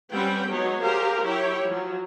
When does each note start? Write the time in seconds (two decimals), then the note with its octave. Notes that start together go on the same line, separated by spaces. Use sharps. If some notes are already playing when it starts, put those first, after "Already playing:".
0.13 G3 C4 C#4 B4 F#5 G5
0.50 F#3 G#3 B3 D#4 C#5
0.83 G4 G#4 A#4 C5 F5
1.22 F#3 E4 G4 C#5 G5
1.65 F3 F#3